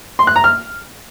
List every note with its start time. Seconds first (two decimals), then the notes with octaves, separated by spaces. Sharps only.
0.19 C6
0.27 F#6
0.36 A#5
0.44 F6